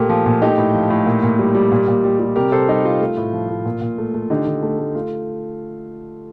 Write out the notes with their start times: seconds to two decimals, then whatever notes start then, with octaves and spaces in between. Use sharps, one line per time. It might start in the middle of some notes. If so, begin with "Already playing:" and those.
Already playing: A#2 A3 G4 A#4
0.09 F3
0.26 A#2
0.42 A3 D#4 G4
0.58 A2
0.75 F3
0.90 A2
1.06 A#2
1.23 A#2
1.39 G3
1.55 G3
1.72 A#2
1.88 A#2
2.04 G3
2.20 G3
2.36 C3 G4 A#4
2.52 C3 A4 C5
2.68 G3 D#4 G4
2.84 G3 F4
3.01 A3
3.17 A2
3.33 F3
3.49 A2
3.65 A#2
3.81 A#2
3.98 A3
4.14 A3
4.30 D3 D#4 G4
4.46 D3
4.63 A3
4.79 A3
4.95 A3 F4